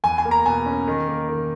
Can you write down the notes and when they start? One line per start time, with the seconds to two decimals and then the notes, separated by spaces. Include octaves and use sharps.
0.04 E2 G#5
0.18 G#5
0.25 A#3
0.31 A#5
0.46 B2 G#5
0.66 C#4
0.87 D#3
1.08 A#3
1.29 D#3